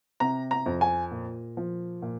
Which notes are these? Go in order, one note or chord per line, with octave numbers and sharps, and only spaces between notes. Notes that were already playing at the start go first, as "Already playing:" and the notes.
C3 A#5
A#5
F2
G#5
A#2
F3
A#2